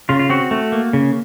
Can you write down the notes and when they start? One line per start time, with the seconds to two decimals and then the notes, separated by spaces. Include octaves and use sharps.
0.09 C#3 F4
0.19 F4
0.30 C4 F#4
0.51 A3
0.72 A#3
0.93 C#3